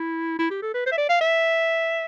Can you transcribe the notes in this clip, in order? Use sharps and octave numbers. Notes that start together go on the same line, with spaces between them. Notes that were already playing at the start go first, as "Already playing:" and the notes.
Already playing: E4
E4
G4
A4
B4
C5
E5
D5
F5
E5